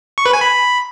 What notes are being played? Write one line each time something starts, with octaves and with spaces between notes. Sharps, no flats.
C#6
B4
G#5
B5